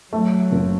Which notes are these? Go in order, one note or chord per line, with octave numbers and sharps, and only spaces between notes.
F#3 A3
F#1